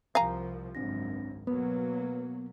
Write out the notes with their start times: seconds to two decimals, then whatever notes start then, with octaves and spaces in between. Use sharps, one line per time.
0.15 C2 F3 A#4 F5 G#5 A#5
0.75 G#1 C#2 F#2 C4 D4 A#6
1.47 B2 F#3 A#3 B3 B4